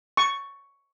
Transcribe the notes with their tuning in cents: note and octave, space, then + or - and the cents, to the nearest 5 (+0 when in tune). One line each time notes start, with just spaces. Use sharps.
C#6 +5